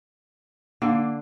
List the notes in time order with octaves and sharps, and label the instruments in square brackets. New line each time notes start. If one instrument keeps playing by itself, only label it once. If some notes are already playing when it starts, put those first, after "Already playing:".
[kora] D3 [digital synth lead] A#3